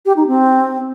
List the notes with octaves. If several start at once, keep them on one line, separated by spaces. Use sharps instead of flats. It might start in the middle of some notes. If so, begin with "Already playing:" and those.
G4
D#4
C4